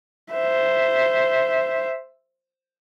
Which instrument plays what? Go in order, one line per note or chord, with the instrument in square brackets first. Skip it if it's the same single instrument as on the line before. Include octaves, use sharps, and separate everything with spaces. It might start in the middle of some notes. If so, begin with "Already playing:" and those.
[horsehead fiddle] C5 E5